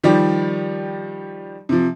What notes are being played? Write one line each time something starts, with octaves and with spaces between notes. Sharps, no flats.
D#3 F3 G3 G4 D5
C3 F3